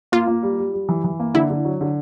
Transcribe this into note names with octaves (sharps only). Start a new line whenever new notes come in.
A#3 F4
A#3
G3
G3
G3
E3
E3
A#3
D3 E4
D3
F#3
D3